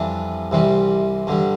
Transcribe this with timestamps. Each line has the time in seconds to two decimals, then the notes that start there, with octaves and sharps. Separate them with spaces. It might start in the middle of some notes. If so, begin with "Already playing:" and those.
Already playing: F2 E3 G3 D4
0.51 C2 C3 E3 G3
1.27 G2 D3 G3